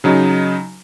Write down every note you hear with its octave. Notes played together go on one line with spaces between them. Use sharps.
C#3 F#3 D#4